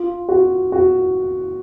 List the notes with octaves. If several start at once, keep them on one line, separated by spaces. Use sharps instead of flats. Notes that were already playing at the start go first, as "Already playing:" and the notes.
Already playing: F4
F#4
F#4